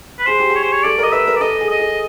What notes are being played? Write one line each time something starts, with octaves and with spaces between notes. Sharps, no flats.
B4
G#4 C5
G4
G#4
C#5
C5
C#5
A4 D5
A#4 D#5
B4 E5
A#4
D5
A4 D#5
G#4
D#5
G#4